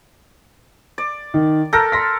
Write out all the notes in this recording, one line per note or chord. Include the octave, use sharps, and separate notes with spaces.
D5
D#3
A4 A#4 G6 A#6
C6 A#6 B6